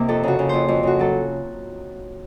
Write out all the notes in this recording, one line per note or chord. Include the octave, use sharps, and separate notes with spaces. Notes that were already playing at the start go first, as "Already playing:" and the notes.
Already playing: C3 A#3 D#4
F2 A4
C#3 F#4
C#3
F2 C5
F2
C#3 F#4
F#3 A4